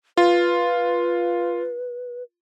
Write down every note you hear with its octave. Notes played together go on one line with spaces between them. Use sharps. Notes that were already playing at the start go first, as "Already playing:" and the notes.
F4 B4